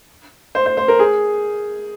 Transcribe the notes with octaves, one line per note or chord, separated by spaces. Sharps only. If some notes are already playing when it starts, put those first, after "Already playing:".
C5
C5
C5
A#4
G#4